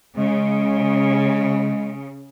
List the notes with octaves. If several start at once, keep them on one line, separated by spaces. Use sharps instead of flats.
C#3 G#3